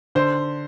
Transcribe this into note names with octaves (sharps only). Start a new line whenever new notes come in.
D3 C5